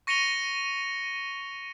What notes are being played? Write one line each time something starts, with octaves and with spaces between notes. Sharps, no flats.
C#6 A#6 C#7 D#7 F7 G7